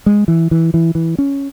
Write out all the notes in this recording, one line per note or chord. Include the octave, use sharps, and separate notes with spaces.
G#3
E3
E3
E3
E3
C#4